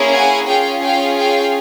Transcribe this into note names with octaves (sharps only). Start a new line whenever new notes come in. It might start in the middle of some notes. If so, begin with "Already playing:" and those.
Already playing: A#3 C#4 E4 G#4
F#5 G#5
C#4 F4 G#4 F5 G5
F5 G5
F5 G5